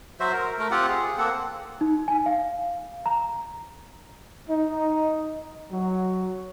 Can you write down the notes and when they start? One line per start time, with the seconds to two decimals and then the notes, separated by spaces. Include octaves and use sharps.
0.20 F#3 F#4 C5 E5
0.33 A#4
0.59 A3 A#4
0.71 C4 F4 G4 F#5
0.89 G#4
1.18 A#3 C4 A4 F#5
1.81 D#4
2.08 G#5
2.26 F5
3.06 A#5
4.49 D#4
5.72 F#3